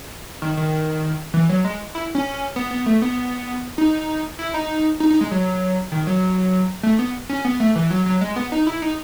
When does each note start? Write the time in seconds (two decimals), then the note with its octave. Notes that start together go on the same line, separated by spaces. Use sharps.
0.42 D#3
0.57 D#3
1.34 E3
1.49 F#3
1.65 G#3
1.95 E4
2.15 C#4
2.56 B3
2.71 B3
2.86 A3
3.02 B3
3.78 D#4
4.39 E4
4.54 D#4
5.00 D#4
5.10 D#4
5.21 G#3
5.31 F#3
5.92 D#3
6.07 F#3
6.83 A3
6.99 B3
7.29 C#4
7.45 B3
7.60 A3
7.75 E3
7.90 F#3
8.06 F#3
8.21 G#3
8.36 B3
8.52 D#4
8.67 E4
8.82 D#4